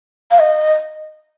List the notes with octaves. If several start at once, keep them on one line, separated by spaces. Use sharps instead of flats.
F5
D#5